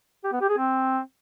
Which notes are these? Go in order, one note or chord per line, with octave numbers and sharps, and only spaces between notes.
G4
B3
G4
G#4
C4